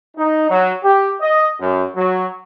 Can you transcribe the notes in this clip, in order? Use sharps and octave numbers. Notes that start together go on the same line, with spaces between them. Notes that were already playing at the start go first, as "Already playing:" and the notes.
D#4
F#3
G4
D#5
F#2
F#3